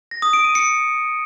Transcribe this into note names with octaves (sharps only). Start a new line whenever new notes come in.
A#6
D#6
D7
D#7
C#7